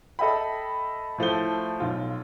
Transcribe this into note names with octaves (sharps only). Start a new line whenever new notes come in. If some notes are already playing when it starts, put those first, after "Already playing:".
A4 D#5 E5 G5 B5
A2 F3 A3 G7
B1 F4